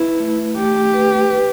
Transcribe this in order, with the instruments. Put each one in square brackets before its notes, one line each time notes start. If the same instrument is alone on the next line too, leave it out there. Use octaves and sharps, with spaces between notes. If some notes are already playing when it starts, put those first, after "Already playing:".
Already playing: [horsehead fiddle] E4 [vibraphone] B4
[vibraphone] A3
[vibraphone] A3 [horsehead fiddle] G4
[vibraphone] B4
B4